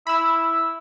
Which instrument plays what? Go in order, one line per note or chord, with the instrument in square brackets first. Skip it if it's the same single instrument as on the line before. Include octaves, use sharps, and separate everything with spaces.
[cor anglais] E4 [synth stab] B5 E6